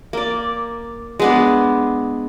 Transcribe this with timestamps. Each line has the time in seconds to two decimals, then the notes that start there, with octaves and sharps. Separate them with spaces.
0.13 A#3 D5
1.20 G#3 B3 D4